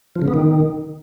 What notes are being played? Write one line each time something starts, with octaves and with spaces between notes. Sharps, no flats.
F3
C#3
B3
D#3